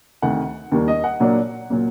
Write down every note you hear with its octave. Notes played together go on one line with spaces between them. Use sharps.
D2 C3 D#3 F#5
D#2 D#3 G3 A#3
D#5
F#5
A#2 F#3 A#3 D4
A#2 F#3 A#3